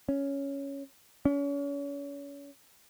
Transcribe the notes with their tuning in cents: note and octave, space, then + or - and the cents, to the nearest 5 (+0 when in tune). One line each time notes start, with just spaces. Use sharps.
C#4 +5
C#4 +35